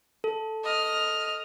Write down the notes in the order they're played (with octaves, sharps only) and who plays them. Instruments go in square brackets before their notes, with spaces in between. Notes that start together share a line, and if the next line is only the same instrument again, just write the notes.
[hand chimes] A4
[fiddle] D#5 F6